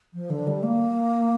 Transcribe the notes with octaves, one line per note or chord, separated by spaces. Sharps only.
F3
D3
G3
A#3